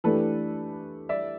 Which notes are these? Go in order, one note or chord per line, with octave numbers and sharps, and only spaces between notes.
E3 A3 D4 G4 A4 B4
D5 E5